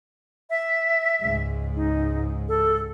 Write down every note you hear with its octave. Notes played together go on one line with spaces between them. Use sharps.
E5
C#2 G#2
D#4
A4